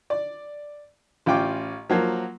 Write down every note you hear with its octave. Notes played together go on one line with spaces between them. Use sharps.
D5
A1 C#4 F4 G5 D6
F3 F#3 A#3